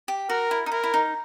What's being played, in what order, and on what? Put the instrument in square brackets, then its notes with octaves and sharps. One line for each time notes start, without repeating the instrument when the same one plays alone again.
[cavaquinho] G4
[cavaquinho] F#4 [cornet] A#4
[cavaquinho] E4
D#4
[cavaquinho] E4 [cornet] A#4
[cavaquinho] E4
D#4